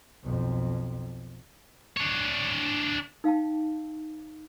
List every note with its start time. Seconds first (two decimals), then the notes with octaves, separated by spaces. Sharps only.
0.23 B1 F2
1.97 D4 C#5
3.24 D#4 F5 G5 A5